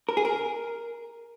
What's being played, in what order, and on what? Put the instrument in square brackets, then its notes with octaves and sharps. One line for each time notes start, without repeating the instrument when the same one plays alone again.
[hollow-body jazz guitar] A#4
G#4
A#4